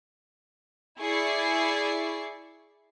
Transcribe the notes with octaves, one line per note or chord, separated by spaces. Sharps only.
E4 G#4 D5 C#6 C7